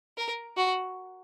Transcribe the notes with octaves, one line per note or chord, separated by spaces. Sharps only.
A#4
F#4